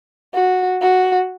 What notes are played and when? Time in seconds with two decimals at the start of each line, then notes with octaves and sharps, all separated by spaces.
0.34 F#4
0.81 F#4